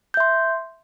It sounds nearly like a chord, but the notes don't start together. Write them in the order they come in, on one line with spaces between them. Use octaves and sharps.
G6 E5 C6